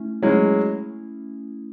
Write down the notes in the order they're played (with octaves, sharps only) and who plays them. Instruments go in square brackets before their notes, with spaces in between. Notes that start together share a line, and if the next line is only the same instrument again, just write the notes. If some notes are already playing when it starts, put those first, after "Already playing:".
Already playing: [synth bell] A3 C#4 E4
[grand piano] F#3 G#3 [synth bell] A3 C#4 E4